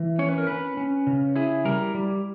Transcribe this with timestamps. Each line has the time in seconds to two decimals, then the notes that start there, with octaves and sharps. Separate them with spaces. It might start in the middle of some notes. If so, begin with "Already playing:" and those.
Already playing: E3
0.19 C#4 C#5
0.28 B4
0.38 A#4
0.47 C#4 B4
0.77 C#4
1.07 C#3
1.36 E4 G#4
1.65 G3 A#4
1.95 G3